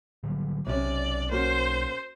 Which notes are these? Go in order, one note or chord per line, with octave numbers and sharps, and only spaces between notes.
D3 F#3 G3
B1 C3 C#4 D5
A#3 C#4 F#4 C5